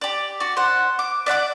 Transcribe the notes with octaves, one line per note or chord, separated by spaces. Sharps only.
G4 D5
F#4 D5
C5 F#5
D6
D5 E5 F#5 D6